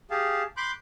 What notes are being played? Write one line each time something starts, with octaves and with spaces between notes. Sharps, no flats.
G4 G#4 F5 A5
B5 C6 D6 F#6 G6